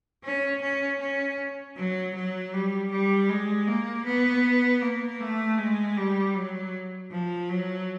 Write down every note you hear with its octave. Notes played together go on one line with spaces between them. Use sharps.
C#4
C#4
C#4
F#3
F#3
G3
G3
G#3
A#3
B3
A#3
A3
G#3
G3
F#3
F3
F#3